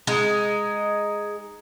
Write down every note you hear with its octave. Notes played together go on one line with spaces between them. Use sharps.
G#3 D#4